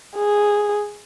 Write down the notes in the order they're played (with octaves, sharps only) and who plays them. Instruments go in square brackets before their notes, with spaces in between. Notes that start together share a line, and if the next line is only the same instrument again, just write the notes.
[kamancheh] G#4